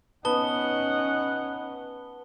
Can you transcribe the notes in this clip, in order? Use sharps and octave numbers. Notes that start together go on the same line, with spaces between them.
B3 C#4 D#4 F#5 A5 G7